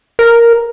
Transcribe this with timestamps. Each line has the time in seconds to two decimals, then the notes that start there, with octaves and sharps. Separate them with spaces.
0.19 A#4